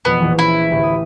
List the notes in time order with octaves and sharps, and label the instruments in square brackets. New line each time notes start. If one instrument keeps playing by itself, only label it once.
[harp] E1 F2 B2 [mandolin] B3
[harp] A#1 E3 C#6
[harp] C#4 [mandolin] E4
[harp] A1 D2 G4
D#6